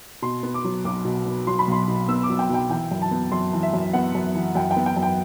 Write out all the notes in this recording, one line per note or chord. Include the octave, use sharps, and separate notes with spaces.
B2 C6
B3
D6
F#3
B1 D6
B2
B3
F#3 C6
B5
B1 C6
B2
B3 E6
D6
F#3
G5
B1 G5
E3 G5
F#2
A5
B3
F#2 C6
E3
E5
F#2
B3 F#5
F#2
E3
F#2 G5
G5
B3
G5
F#2
G5